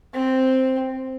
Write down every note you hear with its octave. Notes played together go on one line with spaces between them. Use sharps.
C4